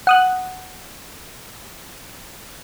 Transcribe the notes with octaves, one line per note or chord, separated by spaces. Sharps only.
F#5 D#6 F#6